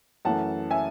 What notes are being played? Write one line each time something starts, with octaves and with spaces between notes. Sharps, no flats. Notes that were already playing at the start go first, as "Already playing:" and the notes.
F#2 E3 A3 F#5 A5
E5 G#5